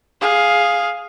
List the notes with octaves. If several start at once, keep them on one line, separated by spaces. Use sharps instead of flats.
G#4 F5